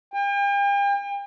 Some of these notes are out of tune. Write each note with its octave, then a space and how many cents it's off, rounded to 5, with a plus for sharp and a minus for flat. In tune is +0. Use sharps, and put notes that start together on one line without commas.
G5 +40